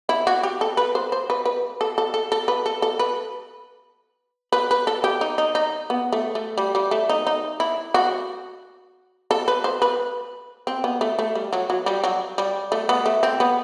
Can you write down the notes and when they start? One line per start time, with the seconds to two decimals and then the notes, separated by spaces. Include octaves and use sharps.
0.09 E4
0.27 F#4
0.43 G4
0.61 A4
0.77 B4
0.95 C5
1.12 C5
1.30 B4
1.46 B4
1.81 A4
1.98 A4
2.14 A4
2.32 A4
2.48 B4
2.66 A4
2.82 A4
2.99 B4
4.52 B4
4.71 B4
4.87 A4
5.04 G4
5.21 D#4
5.38 D#4
5.55 D#4
5.90 B3
6.12 A3
6.35 A3
6.58 G3
6.75 G3
6.91 A3
7.09 D#4
7.27 D#4
7.60 E4
7.94 F#4
9.31 A4
9.48 B4
9.64 C5
9.82 B4
10.67 C4
10.84 B3
11.01 A3
11.19 A3
11.35 G3
11.53 F#3
11.70 F#3
11.86 G3
12.04 F#3
12.38 G3
12.72 A3
12.89 B3
13.06 A3
13.23 C4
13.40 B3